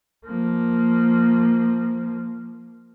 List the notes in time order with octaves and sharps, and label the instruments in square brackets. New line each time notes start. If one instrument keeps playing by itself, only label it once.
[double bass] F3 A#3